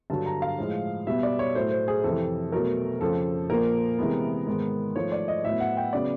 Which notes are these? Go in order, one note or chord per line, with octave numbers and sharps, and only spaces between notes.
G2 D3 F#3 A5
A#5
F5
A2 F3 G#3
B2 G3 B3 E5
D5
C#5
A2 F#3 A3 C5
C5
G#4
F2 C3 E3 A4
B2 F#3 A3 A#4
F2 C#3 F3 A4
A#2 F3 A#3 A#4
C3 E3 G#3 B3
G#2 D#3 G#3 B3
G#2 F3 A3 C#5
D5
D#5
A2 F#3 B3 E5
F#5
G5
C#3 F#3 B3 D5